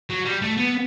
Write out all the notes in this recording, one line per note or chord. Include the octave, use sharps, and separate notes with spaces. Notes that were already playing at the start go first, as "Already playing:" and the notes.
F#3
G3
A3
B3